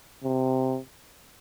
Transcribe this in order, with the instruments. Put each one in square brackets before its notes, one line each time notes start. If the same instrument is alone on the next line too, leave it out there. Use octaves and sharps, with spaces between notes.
[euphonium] C3